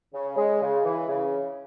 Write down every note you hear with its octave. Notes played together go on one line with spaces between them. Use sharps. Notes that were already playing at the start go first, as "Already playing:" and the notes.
C#3
G#3
C#3
E3
C#3